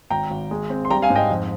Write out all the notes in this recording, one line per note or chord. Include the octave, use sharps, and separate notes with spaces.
G#1 G5 A#5
G#1
G#3
C4
C6
G3 G5 A#5
F5 G#5
G#2
D#5 G5
F2